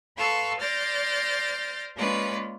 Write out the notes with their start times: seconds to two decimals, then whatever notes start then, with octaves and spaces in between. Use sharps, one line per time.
0.17 A4 B4 F5 C6 C#6 E6
0.59 C5 D5 F6 G6 A6 A#6
1.96 G#3 A#3 C#4 F4 B4 D5